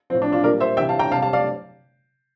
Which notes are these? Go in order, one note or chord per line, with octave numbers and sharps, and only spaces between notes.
A2 F3 C4
D4
D4 F4
A#2 G3 A#4 D5
C5 E5
C3 E3 G3 E5 G5
F5 A5
G5 A#5
C3 F5 A5
G3
F5 A5
D5 F5